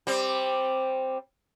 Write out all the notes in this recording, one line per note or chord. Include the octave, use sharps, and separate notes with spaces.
G3 C4